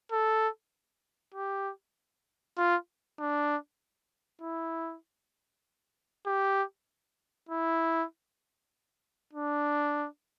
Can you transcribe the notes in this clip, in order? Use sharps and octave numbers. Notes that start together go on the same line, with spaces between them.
A4
G4
F4
D4
E4
G4
E4
D4